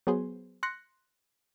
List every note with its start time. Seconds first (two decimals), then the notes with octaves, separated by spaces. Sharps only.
0.07 F#3 B3 G#4 C5
0.63 C6 F#6 A#6 C#7